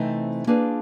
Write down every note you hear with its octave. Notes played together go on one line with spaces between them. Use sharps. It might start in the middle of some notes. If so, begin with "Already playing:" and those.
Already playing: C3 E3 A3 C4 D#4
A#3 D4 F4 G#4 B4